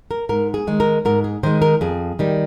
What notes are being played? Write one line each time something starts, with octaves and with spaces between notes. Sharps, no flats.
A#4
G#2 A#4
G#4
D#3 G#3
A#4
G#2 A#4
G#4
D#3 G#3 C5
A#4
F2 G#4
D#3 G3